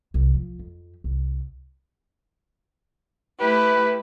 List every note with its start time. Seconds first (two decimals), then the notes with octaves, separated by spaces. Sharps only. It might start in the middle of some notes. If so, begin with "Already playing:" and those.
0.14 C2
0.34 F3
0.59 F2
1.04 C2
3.41 A3 E4 G4 B4